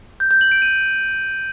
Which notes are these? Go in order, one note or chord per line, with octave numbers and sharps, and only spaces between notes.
G6
G6
F#7
D7
D#7